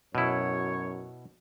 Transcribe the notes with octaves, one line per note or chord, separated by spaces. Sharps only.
F#2 B2 E4 C#5